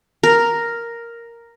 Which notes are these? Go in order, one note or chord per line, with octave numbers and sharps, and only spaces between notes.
A#4